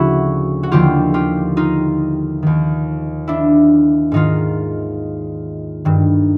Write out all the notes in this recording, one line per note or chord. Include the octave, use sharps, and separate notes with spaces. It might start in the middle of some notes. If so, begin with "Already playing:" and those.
Already playing: D2 C#3 F3 E4 F#4
F#4
D#2 D3 F3 F4 G4
F4 G4
D#4 F4
D#2 D#3
D4 E4
G#2 D#3 D#4 F4
G2 D#3